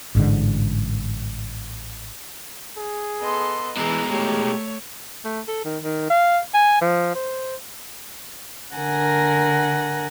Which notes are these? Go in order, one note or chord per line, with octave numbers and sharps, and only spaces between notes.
A1 G#2 D3
G#4
B3 A4 D#5 C6
B2 E3 G#3 A#5
A3 G4 C#5
A3
A4
D#3
D#3
F5
G#5
F3
C5
D3 A#4 F#5 G#5 A#6